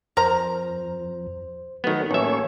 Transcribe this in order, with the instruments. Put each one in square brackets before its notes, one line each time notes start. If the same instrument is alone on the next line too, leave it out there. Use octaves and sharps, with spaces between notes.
[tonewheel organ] F2 [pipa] A#4 A#5 [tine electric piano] C5
[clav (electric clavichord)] D#3 B3 [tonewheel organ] F#3 A3
[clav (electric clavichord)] A1 E5 [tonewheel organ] A#3 C#4 C#5